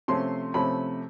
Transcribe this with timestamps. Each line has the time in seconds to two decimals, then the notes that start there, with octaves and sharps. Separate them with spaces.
0.08 C3 F3 A3 C#4 C6
0.54 C3 F3 A3 C#4 B5